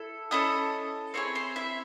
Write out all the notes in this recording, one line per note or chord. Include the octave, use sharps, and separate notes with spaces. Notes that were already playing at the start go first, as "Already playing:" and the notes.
Already playing: E4 A4
C#4 E4 A4 D#5 D#6
C4 E4 G#4 C#5 C#6
C5 C6
E4 E5